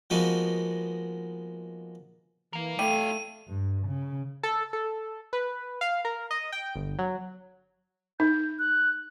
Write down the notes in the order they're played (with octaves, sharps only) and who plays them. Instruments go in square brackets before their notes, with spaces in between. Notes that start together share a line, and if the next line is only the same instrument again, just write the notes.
[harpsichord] F3 G#3 A#3 B3 D#4 F#4
[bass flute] E3 [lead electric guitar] A#4 F5
[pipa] G3 [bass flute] A3 [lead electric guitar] E4 F5 [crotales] D#7
[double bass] G2
C#3
[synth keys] A4
A4
B4
F5
A#4
D#5
G5
G1
F#3
[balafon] D#4 [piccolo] G6
[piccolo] F#6